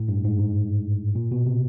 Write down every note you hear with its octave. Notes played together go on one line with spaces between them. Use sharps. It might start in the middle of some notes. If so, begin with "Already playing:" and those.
Already playing: A2
G2
G#2
G#2
A#2
B2
C3